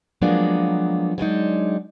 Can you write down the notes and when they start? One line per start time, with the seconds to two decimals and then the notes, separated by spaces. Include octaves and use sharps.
0.22 F3 F#3 G#3 A#3 B3 D4
1.18 F#3 G#3 D4 D#4